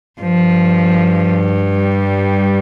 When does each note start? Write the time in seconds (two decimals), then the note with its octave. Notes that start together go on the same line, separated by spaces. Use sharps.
0.21 G2 F3
1.77 G3